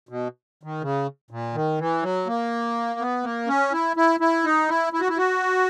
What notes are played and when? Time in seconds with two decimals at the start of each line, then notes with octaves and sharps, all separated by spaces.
0.09 B2
0.63 D#3
0.82 C#3
1.31 A#2
1.54 D#3
1.79 E3
2.02 F#3
2.27 A#3
3.00 B3
3.23 A#3
3.47 C#4
3.72 E4
3.96 E4
4.20 E4
4.44 D#4
4.69 E4
4.93 E4
5.01 F#4
5.09 E4
5.17 F#4